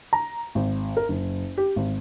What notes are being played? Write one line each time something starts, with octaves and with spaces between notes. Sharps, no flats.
A#5
G#1
A#4
F#1
G4
G#1